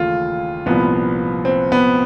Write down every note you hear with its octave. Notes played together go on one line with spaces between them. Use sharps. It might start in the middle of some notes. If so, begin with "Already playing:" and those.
Already playing: D#2 C#3 E3 A3 F4
C2 A#2 F3 B3
C4
B3